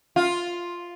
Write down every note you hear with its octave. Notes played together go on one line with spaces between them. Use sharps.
F4